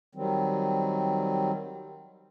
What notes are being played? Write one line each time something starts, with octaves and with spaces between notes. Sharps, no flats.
D#3 F#3 G3 C4